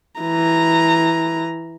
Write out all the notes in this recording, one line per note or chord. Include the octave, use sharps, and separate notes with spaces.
E3 A#5